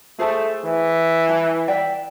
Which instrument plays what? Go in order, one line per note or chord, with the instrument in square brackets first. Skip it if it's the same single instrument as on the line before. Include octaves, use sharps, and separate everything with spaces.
[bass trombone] A3 [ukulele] G#4 C5 A5
[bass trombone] E3
[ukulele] E5 A5
D5 E5 G5